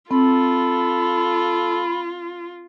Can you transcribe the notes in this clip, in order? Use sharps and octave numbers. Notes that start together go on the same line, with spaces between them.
C4 F4 A4 B5